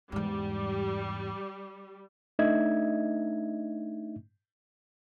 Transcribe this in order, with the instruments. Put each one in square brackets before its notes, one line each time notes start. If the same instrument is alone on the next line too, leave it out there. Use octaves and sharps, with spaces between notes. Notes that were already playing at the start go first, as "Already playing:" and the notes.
[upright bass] E2 G#2 [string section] G3
[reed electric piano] A3 D4 D#4 D#5 E5 G#6